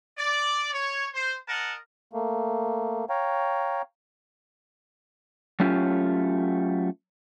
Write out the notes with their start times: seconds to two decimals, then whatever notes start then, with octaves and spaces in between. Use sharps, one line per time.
0.17 D5
0.73 C#5
1.14 C5
1.47 A#4 D#5 F#5 A5
2.13 A3 A#3
3.09 C#5 F5 G5 A#5
5.60 F#3 A3 C#4 F4 G4